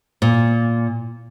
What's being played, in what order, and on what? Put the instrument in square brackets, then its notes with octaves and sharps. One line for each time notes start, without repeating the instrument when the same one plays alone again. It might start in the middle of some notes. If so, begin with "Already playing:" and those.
[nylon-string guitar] A#2